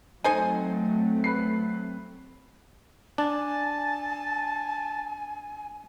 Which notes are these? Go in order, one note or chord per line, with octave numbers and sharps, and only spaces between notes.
F#3 A3 C4 D#4 A4 C5 G#5
B4 C7
D4 G#5 A5